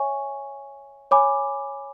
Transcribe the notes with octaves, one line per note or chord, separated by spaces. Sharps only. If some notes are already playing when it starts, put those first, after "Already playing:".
Already playing: C#5 E5 G#5 C#6
C#5 G#5 B5 D6